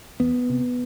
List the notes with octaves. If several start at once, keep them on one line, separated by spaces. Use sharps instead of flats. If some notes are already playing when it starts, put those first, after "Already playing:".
E2 B3
C3